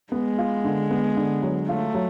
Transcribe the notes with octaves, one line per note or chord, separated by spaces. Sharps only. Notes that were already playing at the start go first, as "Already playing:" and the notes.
G#3 B3
F4
D3
B3
D3
F#3
A3 F4
F#3